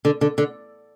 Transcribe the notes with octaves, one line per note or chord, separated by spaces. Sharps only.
D3
D3
D3